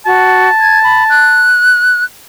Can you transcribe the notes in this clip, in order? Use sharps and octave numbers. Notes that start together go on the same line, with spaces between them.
F#4 A5
G#6
B5
F#6